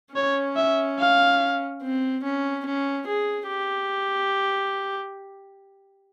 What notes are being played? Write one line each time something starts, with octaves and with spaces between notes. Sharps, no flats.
C#4 C#5
E5
F5
C4
C#4
C#4
G#4
G4